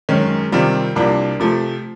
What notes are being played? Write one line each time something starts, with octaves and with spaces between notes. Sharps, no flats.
F#2 D#3 G#3 C#4
C3 D#3 G3 C4 F4
C2 C3 F3 A#3 D4
C3 F3 A3